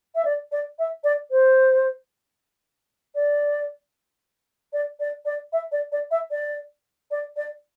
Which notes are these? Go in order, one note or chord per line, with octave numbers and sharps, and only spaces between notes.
E5
D5
D5
E5
D5
C5
D5
D5
D5
D5
E5
D5
D5
E5
D5
D5
D5